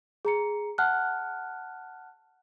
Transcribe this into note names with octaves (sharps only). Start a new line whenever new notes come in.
G#4 A#5 C#7
F#5 A5 F6 F#6